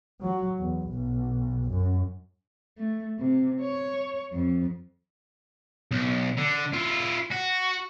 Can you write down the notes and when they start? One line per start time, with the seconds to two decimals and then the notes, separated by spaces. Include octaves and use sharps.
0.23 F#3
0.59 E2
0.92 B1
1.71 F#2
2.78 A3
3.19 C3
3.61 C#5
4.33 F2
5.91 B1
6.37 D3
6.74 E4 F4
7.31 F#4